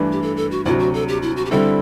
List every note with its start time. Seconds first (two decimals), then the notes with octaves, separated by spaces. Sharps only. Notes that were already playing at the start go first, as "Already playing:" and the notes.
Already playing: G2 E3 A3 D4
0.12 G4
0.22 A4
0.37 A4
0.51 F#4
0.65 D2 C3 F#3 E4
0.79 F#4
0.94 A4
1.08 G4
1.22 E4
1.37 F#4
1.45 G4
1.51 G2 D3 G3 C4 E4 A4